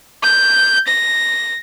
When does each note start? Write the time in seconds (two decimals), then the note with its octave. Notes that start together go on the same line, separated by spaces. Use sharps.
0.23 G6
0.87 A#6